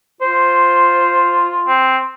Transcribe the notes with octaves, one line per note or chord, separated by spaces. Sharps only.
F4 C5
C4